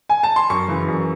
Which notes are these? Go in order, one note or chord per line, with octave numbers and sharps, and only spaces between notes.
G#5
A5
C6
F#2 C#6
C#3 E3
F#2